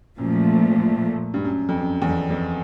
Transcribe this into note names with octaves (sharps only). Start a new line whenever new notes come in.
F#2 A#2 F3 A3
G2
F#2
F2
F#2
E2
F2
F2